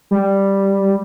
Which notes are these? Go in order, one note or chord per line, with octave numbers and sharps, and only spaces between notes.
G3